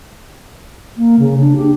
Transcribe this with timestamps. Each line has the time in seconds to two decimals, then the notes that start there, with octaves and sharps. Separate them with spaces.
0.97 A#3
1.19 C#3
1.40 D4
1.56 G4